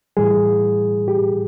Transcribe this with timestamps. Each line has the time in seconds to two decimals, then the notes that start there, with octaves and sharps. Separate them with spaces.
0.17 A2 E3 G3 G#4
1.08 G4